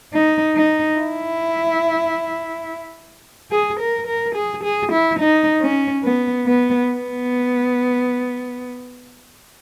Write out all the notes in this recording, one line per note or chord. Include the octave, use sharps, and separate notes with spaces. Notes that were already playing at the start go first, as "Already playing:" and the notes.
D#4
D#4
E4
G#4
A#4
A#4
G#4
G#4
E4
D#4
C#4
B3
B3
B3